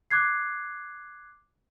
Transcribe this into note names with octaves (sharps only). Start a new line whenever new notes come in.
D6 F#6 G#6 C7